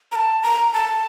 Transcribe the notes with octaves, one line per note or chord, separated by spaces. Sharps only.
A#5
A5
A#5
A5